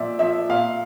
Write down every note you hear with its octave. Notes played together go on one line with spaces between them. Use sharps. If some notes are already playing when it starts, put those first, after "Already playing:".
Already playing: A#2 F3 D5 E5
F3 E5
A#2 F5